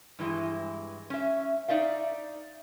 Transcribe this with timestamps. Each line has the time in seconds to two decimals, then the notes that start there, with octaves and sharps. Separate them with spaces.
0.19 G2 E3 G#3 E4
1.10 C#4 E5
1.68 D#4 D5 E5 F5